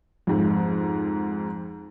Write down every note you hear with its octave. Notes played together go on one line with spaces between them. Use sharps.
F2 G#2